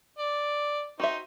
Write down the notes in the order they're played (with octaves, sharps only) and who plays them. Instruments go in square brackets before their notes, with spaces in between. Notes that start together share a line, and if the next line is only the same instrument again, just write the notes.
[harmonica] D5
[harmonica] D#4 C5 [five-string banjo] F#4 E5